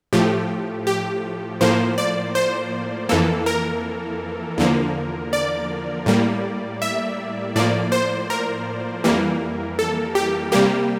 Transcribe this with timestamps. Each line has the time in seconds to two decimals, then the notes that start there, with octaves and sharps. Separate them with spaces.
0.13 A2 F3 A3 G4
0.87 G4
1.61 A2 F3 A#3 C5
1.98 D5
2.35 C5
3.09 F2 E3 A#3 A4
3.46 A#4
4.58 E2 D3 F3 A#3
5.33 D5
6.06 A2 G3 A#3
6.82 E5
7.55 A2 F3 A#3 D5
7.92 C5
8.30 A#4
9.04 F2 E3 G3 A#3
9.79 A4
10.15 G4
10.52 C3 G3 A#3 G4